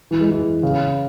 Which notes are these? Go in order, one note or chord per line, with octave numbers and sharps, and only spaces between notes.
E3
G#3
E3
C#3